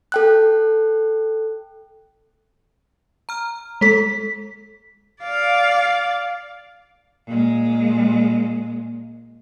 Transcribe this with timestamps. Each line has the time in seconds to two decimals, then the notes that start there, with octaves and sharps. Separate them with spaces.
0.12 A4 G5 F#6
3.29 A#5 F6
3.81 G#3 A4 B6
5.23 D5 F5
7.26 A#2 G#3